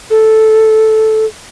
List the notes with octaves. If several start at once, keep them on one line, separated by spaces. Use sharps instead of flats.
A4